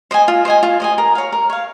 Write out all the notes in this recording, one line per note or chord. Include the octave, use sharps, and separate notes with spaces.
C5 D#5 G#5
F4
C5 D#5 G#5
F4
C5 D#5 G#5
A#4
C#5 F5
A#4
C#5 F5